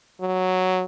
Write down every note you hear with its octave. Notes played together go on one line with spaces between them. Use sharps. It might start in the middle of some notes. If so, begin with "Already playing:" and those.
F#3